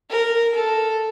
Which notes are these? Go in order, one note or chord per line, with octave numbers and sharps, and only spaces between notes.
A#4
A4